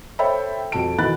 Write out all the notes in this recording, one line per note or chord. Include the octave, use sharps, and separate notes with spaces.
A4 C5 C#5 E5 G5 B5
F2 F#4 A4 A5 D7
B2 D#3 E3 B5 F#6 A6